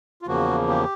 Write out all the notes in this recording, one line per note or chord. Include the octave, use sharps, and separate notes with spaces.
F4
E2 C#3 F3 A#3 F#4
G4